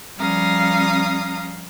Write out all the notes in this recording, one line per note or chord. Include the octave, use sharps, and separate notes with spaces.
F3 G3 C#4 F5 A#5 D#6